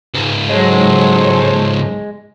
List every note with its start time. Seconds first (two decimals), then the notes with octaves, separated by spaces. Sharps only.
0.14 C#2 G#2
0.50 F#3 G#3 A4 C5 C#5